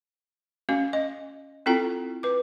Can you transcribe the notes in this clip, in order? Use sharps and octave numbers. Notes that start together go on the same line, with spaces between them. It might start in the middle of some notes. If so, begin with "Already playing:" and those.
C#4 F#4 F5
D#5
C4 E4 F4 A4 G5 A#5
B4 D6